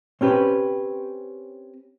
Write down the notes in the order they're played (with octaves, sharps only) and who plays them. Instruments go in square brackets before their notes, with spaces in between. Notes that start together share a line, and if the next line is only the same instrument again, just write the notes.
[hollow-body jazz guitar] C4 C#4 G4 B4